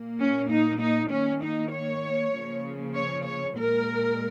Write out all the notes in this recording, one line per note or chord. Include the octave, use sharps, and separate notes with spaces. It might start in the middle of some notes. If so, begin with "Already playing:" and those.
Already playing: A#2 A#3
C#4
D#4
D#4
D#3 A#3 C#4
D#4
C#5
C#3 F3 A#3
C#5
C#5
A#2 G#3 A#4